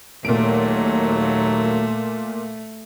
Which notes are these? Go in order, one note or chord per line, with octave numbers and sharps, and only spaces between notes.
D#2 A#2 F#3 A3 A#3 D7